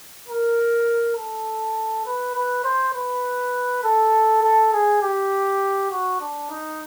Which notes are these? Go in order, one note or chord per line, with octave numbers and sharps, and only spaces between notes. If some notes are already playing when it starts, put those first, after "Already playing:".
A#4
A4
B4
B4
C5
B4
A4
A4
G#4
G4
F#4
D4
D#4